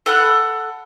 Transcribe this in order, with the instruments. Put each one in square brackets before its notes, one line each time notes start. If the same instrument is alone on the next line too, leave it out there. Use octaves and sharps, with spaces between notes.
[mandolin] A4 F#5 B5 F#6